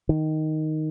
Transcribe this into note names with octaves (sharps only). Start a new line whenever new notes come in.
D#3